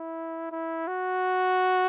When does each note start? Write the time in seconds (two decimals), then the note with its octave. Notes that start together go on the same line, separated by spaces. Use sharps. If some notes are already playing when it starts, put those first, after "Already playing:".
Already playing: E4
0.51 E4
0.87 F#4